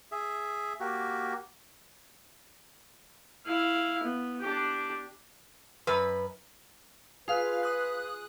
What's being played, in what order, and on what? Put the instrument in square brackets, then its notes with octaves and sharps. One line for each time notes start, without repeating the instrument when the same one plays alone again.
[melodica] G#4 E5
A#3 F#4 G4
[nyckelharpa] E4 F5
B3
D4 G4
[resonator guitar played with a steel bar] F#2 B4
[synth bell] F4 F5 [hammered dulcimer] G#4 [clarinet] B4
[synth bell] D#6 F#6